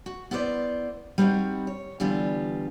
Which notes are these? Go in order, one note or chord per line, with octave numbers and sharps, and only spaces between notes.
F#4
B3 E4 B4 C5 D5
G3 C4 D#4 F#4
C#5
D3 E3 G3 B3 F4